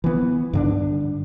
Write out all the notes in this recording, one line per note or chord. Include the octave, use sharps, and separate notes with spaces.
E3 B3
G2 D3 D4